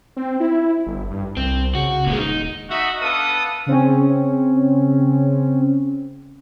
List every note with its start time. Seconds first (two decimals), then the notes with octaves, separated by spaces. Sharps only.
0.17 C4
0.40 E4
0.86 G1
1.10 G2
1.37 C2 C4
1.75 C#3 F#4
2.06 D#1 A#2 G#3
2.19 D#4
2.70 D#4 F#4 D#5 E5
3.01 B3 D4 A4 F5 D#6
3.66 C#3 C4 C#4